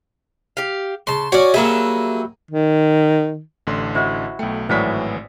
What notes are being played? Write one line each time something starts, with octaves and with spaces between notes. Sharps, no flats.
G4 F5
C#3 A5 C6
C#4 F#4 C#5 D5
F#3 G3 A#3 G#4 E5
D#3
A1 D3 C6
E4 F#4 C5 D#5
B1 A3 G5
G#1 A2 E3 F#3 B4 C5 D5 B6